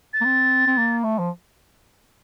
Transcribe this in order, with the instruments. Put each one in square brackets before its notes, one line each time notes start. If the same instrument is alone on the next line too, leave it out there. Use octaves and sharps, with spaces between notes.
[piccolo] A6
[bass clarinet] A#3
C4
C4
A#3
A3
F3